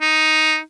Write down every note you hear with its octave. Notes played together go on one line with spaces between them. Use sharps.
D#4